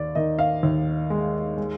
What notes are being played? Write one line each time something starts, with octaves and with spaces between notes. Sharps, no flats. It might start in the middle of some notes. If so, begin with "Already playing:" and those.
Already playing: D#2 D5
D#3 D#5
F5
D#2
G#3
G#3